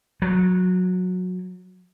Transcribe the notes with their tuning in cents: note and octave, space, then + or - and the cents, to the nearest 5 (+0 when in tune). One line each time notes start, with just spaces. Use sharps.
F#3 -20